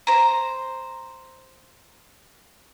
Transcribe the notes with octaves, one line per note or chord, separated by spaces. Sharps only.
C5 A#5